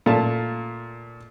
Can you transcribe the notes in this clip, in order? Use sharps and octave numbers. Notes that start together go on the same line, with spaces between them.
A#2 A3 A5